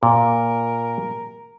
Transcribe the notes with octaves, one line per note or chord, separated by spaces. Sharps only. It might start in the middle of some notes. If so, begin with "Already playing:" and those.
A#2 A#4